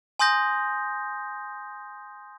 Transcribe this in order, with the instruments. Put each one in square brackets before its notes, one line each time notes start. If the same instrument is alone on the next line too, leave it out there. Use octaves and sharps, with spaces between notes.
[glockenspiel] G#5 C6 D#6 G6 A#6